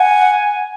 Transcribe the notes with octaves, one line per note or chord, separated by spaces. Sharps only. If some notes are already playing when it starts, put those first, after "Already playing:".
Already playing: F#5 G#5